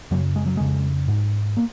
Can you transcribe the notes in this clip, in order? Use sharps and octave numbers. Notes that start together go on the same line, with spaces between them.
F#2 C#3 F#3
G#3
F#3
F2 C#3 G#3
G#2
A#3